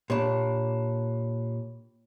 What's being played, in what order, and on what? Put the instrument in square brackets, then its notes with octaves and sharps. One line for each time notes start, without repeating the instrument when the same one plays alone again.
[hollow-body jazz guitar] A#2 D4 [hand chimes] G4 C#5 B5